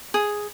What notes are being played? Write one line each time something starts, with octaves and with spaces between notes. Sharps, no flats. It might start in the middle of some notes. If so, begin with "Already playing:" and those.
G#4